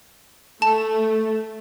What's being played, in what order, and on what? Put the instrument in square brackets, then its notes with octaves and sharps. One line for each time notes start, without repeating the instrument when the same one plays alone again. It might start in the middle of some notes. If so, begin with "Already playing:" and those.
[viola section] A3 [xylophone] A5